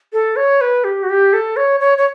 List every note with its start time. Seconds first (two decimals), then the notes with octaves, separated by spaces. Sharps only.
0.13 A4
0.36 C#5
0.61 B4
0.84 G4
1.03 F#4
1.09 G4
1.33 A4
1.57 C#5
1.80 C#5
1.98 C#5